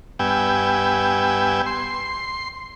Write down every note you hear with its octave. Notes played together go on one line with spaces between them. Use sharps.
G2 B3 G5 G#5 E6
C6